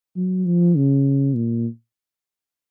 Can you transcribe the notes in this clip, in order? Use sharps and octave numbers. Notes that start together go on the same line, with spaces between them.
F#3
F3
C#3
A#2